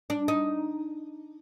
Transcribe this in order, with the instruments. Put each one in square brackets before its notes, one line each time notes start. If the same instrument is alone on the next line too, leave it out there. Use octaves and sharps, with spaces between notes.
[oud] D4
D#4